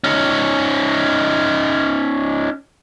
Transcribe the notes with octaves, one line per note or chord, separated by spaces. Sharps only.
C#4 D#4